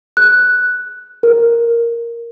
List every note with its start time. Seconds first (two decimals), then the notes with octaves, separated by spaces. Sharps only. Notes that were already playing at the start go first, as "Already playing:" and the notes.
0.17 F#6
1.23 A#4